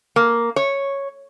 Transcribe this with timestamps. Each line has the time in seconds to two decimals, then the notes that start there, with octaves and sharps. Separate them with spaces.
0.16 A#3
0.56 C#5